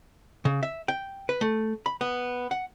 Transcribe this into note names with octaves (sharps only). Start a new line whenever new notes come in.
C#3
E5
G5
B4
A3
B5
B3
F#5